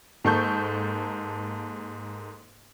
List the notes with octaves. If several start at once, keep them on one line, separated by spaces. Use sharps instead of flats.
G#2 A#3 A4 C#6 G6